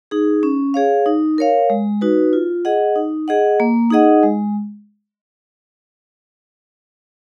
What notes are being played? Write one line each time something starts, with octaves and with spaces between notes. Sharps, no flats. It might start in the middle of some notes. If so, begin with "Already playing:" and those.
D#4 G#4
C#4
G#4 C#5 F5
D#4
A#4 C#5 F5
G#3
D#4 F#4 B4
F4
G#4 D#5 F#5
D#4
G#4 D#5 F#5
A#3
D#4 G#4 D#5 F#5
G#3